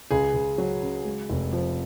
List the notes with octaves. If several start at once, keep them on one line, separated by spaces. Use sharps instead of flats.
C#2 G#4
C#2
F#3
C#3
G#3
F1
F3